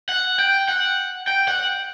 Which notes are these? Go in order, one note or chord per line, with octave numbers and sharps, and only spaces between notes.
F#5
G5
F#5
G5
F#5